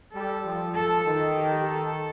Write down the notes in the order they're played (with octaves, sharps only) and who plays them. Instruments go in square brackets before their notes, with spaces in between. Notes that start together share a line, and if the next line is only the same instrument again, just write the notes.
[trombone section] G3 [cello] A4
[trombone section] F3
[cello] A4
[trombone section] D#3
[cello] G4
A4